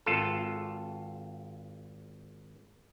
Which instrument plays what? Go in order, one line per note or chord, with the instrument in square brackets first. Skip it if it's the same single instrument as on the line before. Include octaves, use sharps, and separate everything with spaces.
[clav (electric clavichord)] G#1 F4 A4